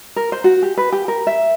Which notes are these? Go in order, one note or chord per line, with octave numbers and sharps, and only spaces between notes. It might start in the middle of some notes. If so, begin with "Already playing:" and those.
A#4
C5
F#4
G4
B4
G4
A#4
E5